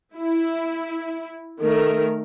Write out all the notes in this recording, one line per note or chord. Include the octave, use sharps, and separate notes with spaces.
E4
D#3 A3 A#4